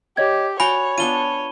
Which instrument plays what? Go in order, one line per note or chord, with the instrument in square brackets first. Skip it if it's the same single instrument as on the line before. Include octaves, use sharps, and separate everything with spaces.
[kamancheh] G4 [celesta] C#5 D#5 G#6
[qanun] F#4 D5 G5 [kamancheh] C#5 [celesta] G#5 [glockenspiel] B5
[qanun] B3 D4 F4 [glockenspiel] D#7 G7